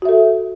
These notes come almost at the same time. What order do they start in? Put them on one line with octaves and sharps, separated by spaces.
F#4 E5 A4